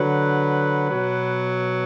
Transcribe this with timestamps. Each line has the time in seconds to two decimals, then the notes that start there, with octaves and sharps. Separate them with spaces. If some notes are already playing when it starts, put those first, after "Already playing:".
Already playing: D3 F#3 B4
0.89 B2 F#3